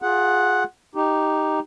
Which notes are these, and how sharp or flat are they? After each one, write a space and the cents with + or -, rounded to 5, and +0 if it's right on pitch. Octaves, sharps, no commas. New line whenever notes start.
F4 +20 G#4 +0 F#5 +0
D#4 +0 G4 +0